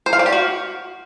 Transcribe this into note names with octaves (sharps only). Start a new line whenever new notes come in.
C5
F5
D5
G4
F#4